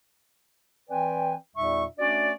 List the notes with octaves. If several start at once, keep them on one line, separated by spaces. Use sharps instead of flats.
E3 C4 B4 D5 G5 G#5
E2 A#2 G3 D#4 E5 C#6
A3 C#4 D4 F#4 D5